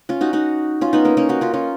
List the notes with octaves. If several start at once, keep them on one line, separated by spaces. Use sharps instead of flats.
C#4 F4
D#4 F#4
D#4 F#4
C#4 F4
B3 D#4
A#3 C#4
A#3 C#4
D#4 F#4
C#4 F4
C#4 F4